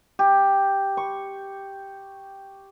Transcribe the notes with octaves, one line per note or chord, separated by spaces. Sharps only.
G4
C#6